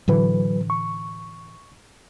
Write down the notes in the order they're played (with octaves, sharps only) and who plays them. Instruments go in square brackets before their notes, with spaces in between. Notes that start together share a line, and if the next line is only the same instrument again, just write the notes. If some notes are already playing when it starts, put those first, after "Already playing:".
[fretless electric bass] A2 D3 E3 [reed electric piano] F#3 B4
[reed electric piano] C#6